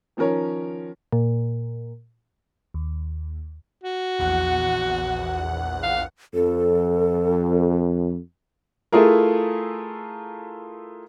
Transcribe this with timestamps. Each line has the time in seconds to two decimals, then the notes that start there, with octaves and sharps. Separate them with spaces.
0.17 D#3 F3 C#4 A#4 C#5
1.12 A#2
2.74 D#2
3.84 F#4
4.19 A#1 E2 F#5
5.83 F5
6.34 F2 A4
8.92 A3 E4 F4 G#4 A#4